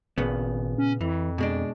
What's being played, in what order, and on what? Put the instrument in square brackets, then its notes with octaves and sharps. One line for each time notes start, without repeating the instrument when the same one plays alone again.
[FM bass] G#1 [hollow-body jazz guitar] A#2 C#3 B3
[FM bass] C#4
[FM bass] F2 [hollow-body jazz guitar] E3
[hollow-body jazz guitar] B2 G#3 D4